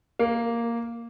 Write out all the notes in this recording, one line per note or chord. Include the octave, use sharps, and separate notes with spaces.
A#3